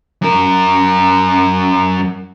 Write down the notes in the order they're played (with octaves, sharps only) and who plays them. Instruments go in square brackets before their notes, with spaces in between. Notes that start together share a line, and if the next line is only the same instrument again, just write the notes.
[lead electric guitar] F#2 A#4